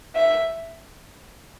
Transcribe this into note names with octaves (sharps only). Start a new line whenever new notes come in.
E5